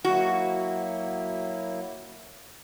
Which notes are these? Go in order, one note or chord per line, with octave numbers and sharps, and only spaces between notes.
F#3 A#3 E4 F#4